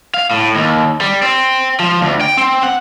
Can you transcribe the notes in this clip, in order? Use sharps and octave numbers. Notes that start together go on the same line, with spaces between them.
F5
A2
D#2
G3
C4
F3
D2
G5
C4
F#5